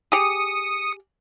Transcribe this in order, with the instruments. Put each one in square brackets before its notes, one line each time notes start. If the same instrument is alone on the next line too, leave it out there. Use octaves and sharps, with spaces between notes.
[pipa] G4 G#4 [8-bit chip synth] D#6 C#7